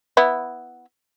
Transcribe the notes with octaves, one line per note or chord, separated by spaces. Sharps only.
B3 E4